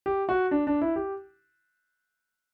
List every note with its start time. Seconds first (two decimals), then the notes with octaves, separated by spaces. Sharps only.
0.06 G4
0.29 F#4
0.51 D4
0.67 D4
0.81 E4
0.96 G4